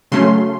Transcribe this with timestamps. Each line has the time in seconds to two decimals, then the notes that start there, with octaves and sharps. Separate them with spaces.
0.12 C#3 F#3 A3 C#4 C6